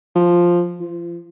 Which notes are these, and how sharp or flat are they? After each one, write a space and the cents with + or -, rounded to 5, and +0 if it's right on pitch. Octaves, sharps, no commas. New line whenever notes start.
F3 +0
F3 -35